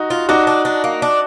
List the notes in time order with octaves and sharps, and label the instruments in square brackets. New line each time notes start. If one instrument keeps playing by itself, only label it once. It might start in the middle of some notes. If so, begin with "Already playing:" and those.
Already playing: [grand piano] D#4 F#4
[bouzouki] F4
[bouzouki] D4 [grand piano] D#4 F#4
[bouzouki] D4
D4
A#3
D4